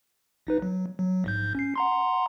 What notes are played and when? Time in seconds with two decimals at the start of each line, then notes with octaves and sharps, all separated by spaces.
0.47 A#1 D#4 B4
0.62 F#3
0.99 F#3
1.24 A#1 G#2 G6
1.55 C#4 C7
1.76 F#5 A#5 C6